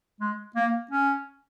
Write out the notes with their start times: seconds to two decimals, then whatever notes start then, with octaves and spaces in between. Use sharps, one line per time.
0.20 G#3
0.56 A#3
0.91 C#4